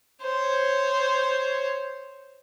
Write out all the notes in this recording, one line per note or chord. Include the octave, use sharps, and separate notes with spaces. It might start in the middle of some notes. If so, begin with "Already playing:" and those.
C5 C#5